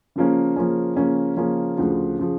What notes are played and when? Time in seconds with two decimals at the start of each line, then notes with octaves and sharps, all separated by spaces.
0.16 C#3 F3 A#3 C#4
0.56 C#3 F3 A#3 C#4
0.96 C#3 F3 A#3 C#4
1.37 C#3 F3 A#3 C#4
1.77 D2 C#3 F3
2.19 C#3 F3